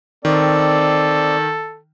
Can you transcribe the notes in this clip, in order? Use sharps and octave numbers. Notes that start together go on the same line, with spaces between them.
D#3 C4 A4 D5